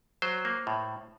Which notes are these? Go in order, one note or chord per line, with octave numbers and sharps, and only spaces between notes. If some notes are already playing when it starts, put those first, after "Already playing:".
F#3 C5
A#3
A2